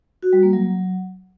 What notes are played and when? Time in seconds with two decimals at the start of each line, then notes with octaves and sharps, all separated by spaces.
0.23 F#4
0.33 G3
0.43 A#3
0.53 F#3